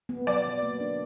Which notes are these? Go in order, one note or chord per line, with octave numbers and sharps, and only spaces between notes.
B3
F#3 D5
F#3
A#3
D4